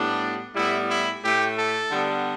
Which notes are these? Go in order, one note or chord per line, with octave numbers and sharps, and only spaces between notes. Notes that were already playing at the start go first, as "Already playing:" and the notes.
Already playing: A2 G3 B3 D4
A2 G3 B3 E4
E4
A2 A3 G4
A4
D3 G3 B3